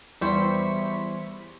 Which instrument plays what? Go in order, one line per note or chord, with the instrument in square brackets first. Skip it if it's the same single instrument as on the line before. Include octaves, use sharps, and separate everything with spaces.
[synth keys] E2 G3 E4 C5 C#6 B6